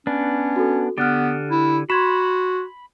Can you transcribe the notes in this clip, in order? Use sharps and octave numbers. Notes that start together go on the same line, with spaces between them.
B3 C#4 D4
F#4 A4
D3 B3 G4 F6 F#6 A6
E4
F#4 B5 C6 G#6 E7